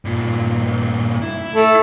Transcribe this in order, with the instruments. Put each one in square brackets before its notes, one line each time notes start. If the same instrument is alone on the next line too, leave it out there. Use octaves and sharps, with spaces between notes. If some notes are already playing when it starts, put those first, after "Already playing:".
[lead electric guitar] G2 A#2
E4
[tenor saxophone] A3